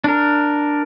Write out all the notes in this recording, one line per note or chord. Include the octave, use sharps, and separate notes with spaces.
D4 A#4